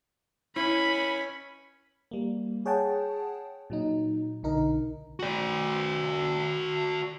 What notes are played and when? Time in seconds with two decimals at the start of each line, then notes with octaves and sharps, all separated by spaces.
0.56 C#4 E4 B5
2.11 G3 A#3
2.66 G#4 C#5 F#5 G5 A5
3.70 A#2 F#3 D#4
4.43 B1 D3 D#4 A#4
5.19 F#4 D5